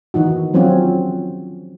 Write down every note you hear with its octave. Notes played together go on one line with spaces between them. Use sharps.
D#3 E3 D#4 F#4
F3 F#3 C4 C#4 F4 F#4